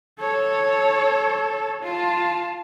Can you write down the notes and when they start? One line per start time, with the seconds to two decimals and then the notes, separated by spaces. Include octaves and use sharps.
0.20 A4 C#5
1.83 F4 A5